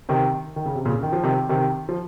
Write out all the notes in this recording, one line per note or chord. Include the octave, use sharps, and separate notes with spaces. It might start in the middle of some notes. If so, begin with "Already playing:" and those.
C3 D#3
D#3
C#3
C3
A#2 C#3
D#3
F3
C3 D#3
C3 D#3
F3